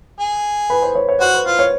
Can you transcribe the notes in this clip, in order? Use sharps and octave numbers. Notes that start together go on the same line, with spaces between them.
G#4
B4
C5
C#5
C#5
F#4 C5
B4
F4 C5
C#5